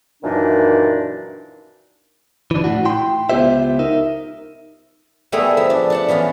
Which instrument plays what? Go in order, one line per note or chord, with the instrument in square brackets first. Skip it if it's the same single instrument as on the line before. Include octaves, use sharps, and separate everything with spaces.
[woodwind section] F#2 A#2 D#3 E3 D4 D#4
[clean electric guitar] E3 D4
A2 F#4
E4 G5 C6
C#2 B3 F4 G4 C5 E5
D#4 A#4 E5
[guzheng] G3 A3 B3 E4 G#4 A#4
F3 E5
D4
D4 F#5 A5
E3 B3 C#4 F4